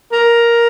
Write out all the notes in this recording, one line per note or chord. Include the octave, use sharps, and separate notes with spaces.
A#4